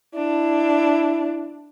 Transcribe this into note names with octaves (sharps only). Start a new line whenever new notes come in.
D4 E4